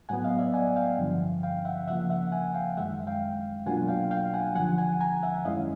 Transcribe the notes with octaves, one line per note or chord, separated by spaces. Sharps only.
A2 F#3 B3 F#5 G#5
D#5 F5
D5 E5
F#5 G#5
F5 G5
G2 D3 F3
F5 G5
E5 F#5
C#3 F3 A#3 E5 F#5
E5 F#5
F#5 G#5
F5 G5
F#2 D#3 G#3 E5 F#5
F5 G5
B2 F#3 A#3 D4 F4 F#5 G#5
F5 G5
F5 G5
F#5 G#5
D#2 D3 F3 F#5 G#5
F#5 G#5
G#5 A#5
E5 F#5
F#2 D#3 G#3 C#4 E4 D#5 F5